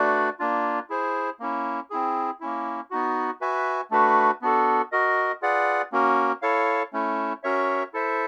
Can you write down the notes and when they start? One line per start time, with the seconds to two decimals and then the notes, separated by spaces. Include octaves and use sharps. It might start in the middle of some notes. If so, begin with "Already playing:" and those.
Already playing: A3 D4 F#4 B4 D5
0.39 A#3 D4 F4
0.90 E4 G#4 C5
1.40 A#3 C#4 E4
1.90 C4 E4 G#4
2.40 A#3 C#4 E4
2.91 B3 D#4 F#4
3.41 F#4 B4 E5 G#5
3.91 A3 D4 F#4 B4
4.42 B3 D4 F#4 A4
4.92 F#4 A#4 D#5
5.42 F4 G#4 B4 D5 F#5
5.92 A#3 C#4 F#4 A#4
6.42 E4 A4 C#5 F5
6.93 A3 C#4 E4
7.44 C#4 F#4 A#4 C#5 E5
7.94 E4 A4 C5 E5